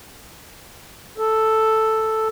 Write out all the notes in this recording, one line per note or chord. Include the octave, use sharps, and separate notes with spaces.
A4